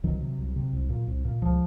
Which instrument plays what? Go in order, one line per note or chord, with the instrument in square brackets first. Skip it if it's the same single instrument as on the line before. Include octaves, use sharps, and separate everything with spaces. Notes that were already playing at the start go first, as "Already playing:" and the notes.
[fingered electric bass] C2 D#3 F#3
C3
C2
C3
C2
A#2
C2
A#2
C#2 F3